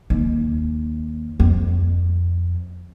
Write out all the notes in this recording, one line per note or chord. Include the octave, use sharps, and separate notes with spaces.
D#2
F2